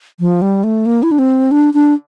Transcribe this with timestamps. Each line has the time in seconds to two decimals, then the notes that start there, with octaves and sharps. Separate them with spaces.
0.20 F3
0.42 G3
0.64 A3
0.86 A#3
1.03 E4
1.11 D4
1.19 C4
1.51 D4
1.74 D4